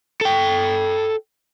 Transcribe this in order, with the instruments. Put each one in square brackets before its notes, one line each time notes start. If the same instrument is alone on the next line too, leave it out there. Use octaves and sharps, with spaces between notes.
[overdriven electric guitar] A4 G5